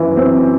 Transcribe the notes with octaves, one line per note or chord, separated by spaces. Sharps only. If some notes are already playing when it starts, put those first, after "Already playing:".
Already playing: F#2 E3
C4